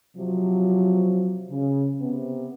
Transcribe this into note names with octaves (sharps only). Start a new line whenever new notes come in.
C3 F3 F#3
C#3
C3 B3